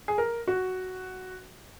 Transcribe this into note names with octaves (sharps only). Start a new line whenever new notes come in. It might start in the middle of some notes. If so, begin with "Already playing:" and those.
G#4
A#4
F#4